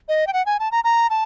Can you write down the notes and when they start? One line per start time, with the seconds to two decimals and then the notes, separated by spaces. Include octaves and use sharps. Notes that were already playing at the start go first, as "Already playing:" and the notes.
0.08 D#5
0.27 G5
0.33 F#5
0.46 G#5
0.60 A5
0.72 A#5
0.84 A#5
1.10 A5